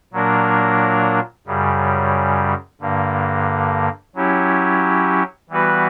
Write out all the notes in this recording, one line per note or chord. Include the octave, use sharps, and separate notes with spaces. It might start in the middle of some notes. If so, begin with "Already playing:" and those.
A#2 F#3 A#3 D4 A#4
F#2 C#3 G3
G2 D3 A#3
F#3 C#4 E4 G4
E3 G3 B3 F#4 B4